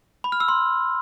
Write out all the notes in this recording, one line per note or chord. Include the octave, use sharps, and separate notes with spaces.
B5
F6
E6
C6